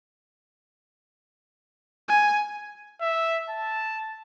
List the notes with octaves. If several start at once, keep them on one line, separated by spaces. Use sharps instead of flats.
G#5
E5
A5